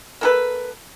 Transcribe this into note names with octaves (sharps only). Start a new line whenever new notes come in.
A#3 A4 B4